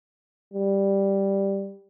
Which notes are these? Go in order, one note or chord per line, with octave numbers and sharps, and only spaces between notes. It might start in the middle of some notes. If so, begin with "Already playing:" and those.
G3